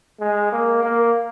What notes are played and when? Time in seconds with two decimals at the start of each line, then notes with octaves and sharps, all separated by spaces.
0.20 G#3
0.52 A#3
0.83 A#3